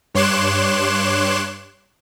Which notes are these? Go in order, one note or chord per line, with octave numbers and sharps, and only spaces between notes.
G2 C#5 C6 D6 F#6 E7